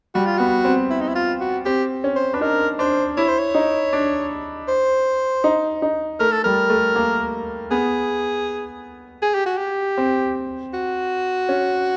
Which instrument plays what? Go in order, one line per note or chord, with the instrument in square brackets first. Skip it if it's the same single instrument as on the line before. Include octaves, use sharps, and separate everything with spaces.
[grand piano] G3 [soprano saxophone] F#4
[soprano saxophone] F4
[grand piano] B3 [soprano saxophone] F#4
[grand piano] C4
[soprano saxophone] E4
D#4
E4
F4
F#4
[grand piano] C4 [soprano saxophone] G4
[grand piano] C#4
[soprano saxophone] C5
[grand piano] D4 [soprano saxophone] B4
[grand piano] D#4 [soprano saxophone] A#4
[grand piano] D4 [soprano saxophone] C5
[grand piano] E4 [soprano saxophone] C#5
[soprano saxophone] C5
C#5
[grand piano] D#4
D4
[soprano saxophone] C5
[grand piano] D#4
D#4
[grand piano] A3 [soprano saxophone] A#4
[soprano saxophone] A4
[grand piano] G3 [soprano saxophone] A#4
[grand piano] A3
A#3
[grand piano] B3 [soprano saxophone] G#4
[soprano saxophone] G#4
G4
F#4
G4
[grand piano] C4
[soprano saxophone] F#4
[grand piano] C#4